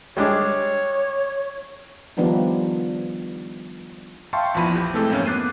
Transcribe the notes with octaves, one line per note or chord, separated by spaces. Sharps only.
G3 G#3 D4 C#5
D#3 F3 G3 B3 D4 D#4
E5 F5 G5 A5 C6 C#6
A#1 E2 E3 F3 B5 D#7
G4 G6
C3 E3 G#3 A3 C4 A4
F2 G#2 A#3 C#4
B3 D6 F#6 A6 C7 D#7